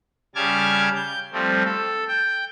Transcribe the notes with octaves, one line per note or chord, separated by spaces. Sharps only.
C#3 G3 A5 D6 F6 G#6
G6
F3 G3 A3 C4
A4
G5